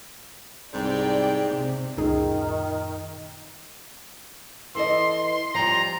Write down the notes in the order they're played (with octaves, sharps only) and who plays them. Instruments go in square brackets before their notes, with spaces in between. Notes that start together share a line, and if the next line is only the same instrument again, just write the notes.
[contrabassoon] C2 [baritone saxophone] G#2 [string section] D5 G5
[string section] C3
[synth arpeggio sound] C#2 D#4 G#4 [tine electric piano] F#2 A#2 [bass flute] D#3
[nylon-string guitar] E3 A4 D#5 [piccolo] C6
[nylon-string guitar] F3 G3 [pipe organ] A#5